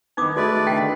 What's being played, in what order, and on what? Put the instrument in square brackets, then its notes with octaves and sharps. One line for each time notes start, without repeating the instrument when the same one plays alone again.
[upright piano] D#3 B3 [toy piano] D#4 D6 D#6
[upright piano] G#3 [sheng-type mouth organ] A3 B4 D5 [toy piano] F#4
[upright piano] D3 D#3 B6 [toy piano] G5